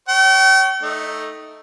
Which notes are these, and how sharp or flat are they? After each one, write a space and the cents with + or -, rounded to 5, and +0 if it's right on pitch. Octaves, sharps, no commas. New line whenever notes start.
C#5 +0 G5 -40
A3 +0 D#4 +0